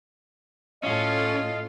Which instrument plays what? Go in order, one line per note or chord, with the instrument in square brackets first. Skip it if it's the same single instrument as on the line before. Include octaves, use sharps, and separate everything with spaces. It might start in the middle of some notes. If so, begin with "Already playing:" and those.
[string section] A2 A4 [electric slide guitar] C#4 [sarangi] F4 [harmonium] D#5